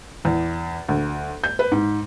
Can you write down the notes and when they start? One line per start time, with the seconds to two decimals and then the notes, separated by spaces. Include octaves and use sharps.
0.25 E2
0.88 D2
1.44 G6
1.59 B4
1.72 G#2